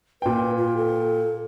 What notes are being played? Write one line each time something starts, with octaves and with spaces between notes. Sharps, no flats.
A#2 B4 G5
F4
A4